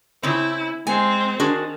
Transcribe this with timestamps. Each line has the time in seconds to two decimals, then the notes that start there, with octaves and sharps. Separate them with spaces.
0.23 C#3 C4 E4
0.87 G#3 C4 G#5
1.40 D#3 D4 F#4 G#4